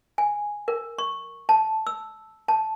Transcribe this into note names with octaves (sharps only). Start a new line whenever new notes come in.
G#5
A#4
C#6
A5
E6
A5